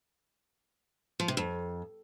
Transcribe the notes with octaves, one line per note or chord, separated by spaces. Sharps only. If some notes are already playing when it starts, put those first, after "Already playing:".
F3
C3
F2